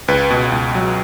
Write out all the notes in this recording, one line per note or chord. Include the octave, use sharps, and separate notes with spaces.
C#2 B4
B2
C#2
F#3